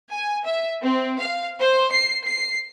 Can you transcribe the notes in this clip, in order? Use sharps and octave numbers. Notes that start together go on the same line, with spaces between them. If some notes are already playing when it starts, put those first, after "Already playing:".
G#5
E5
C4
F5
C5
C7
C7